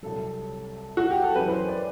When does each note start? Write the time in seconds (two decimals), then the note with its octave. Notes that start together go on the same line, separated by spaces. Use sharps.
0.03 C2 C3 F#3 A4
0.97 F#4
1.11 G4
1.22 A4
1.35 F#2 E3 B4
1.48 B4
1.52 C5
1.68 D5